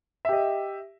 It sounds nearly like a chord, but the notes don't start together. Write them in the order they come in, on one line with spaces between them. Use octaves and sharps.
E5 G4 D#5